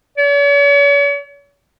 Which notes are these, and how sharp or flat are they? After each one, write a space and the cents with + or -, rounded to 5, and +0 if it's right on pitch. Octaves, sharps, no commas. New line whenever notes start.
C#5 +45